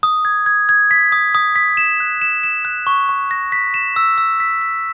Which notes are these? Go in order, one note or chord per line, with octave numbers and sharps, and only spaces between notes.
D#6
G#6
G#6
G#6
B6
D#6
D#6
B6
E7
F#6
E7
E7
F#6
C#6
C#6
A#6
B6
E7
E6
E6
B6
B6